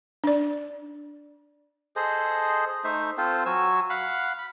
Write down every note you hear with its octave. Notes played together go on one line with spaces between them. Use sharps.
D4 D5
G#4 A4 C5 D#5
A3 D#4 C5 E5
C4 F4 A4 C5
F#3 F#4 G#5 E6
F5 F#5 B5
B5